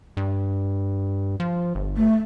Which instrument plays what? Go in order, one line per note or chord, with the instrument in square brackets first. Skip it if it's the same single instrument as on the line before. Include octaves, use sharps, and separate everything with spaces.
[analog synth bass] G2
F3
G1
[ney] A3